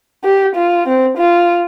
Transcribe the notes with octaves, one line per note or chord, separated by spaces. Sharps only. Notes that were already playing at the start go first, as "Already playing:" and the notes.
G4
F4
C4
F4